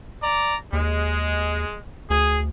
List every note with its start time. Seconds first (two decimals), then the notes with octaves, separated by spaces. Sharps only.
0.23 D5 A#5
0.73 D#2 G#3
2.10 D2 G#4